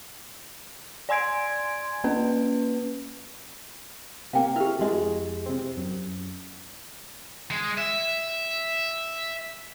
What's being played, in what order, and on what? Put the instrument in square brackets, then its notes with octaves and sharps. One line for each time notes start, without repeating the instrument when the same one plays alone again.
[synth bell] D5 G#5 C6 G#6 D7
A#3 C#4 B4
[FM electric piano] C3 A#3 [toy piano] F5 G5
[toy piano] E4 G4 [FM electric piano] E5 F6
[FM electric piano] F2 G#3 [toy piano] E4 F#4 D#5
[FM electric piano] C3 C4
F#2
[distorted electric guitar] G#3
E5